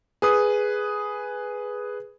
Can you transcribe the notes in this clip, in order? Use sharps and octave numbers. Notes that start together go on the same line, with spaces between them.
G#4 B4 D#6